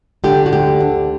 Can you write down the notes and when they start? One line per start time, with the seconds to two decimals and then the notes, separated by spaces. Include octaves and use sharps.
0.24 D3 G4
0.46 F#4
0.52 D2 G4
0.80 D4